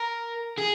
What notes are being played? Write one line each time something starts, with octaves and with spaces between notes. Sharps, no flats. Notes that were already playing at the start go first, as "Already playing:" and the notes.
Already playing: A#4
G#4